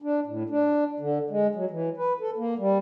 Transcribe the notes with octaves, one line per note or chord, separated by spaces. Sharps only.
D4
A2
D4
D3
G#3
F#3
E3
B4
A4
A#3
G3